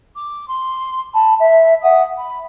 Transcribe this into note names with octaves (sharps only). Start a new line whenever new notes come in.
D6
C6
A5 B5
E5
E5 F#5 D#6
B5